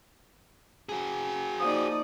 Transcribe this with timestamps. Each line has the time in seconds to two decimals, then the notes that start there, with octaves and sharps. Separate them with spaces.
0.89 F#4 G#4
1.60 F3 A#3 D#4 D5 D#6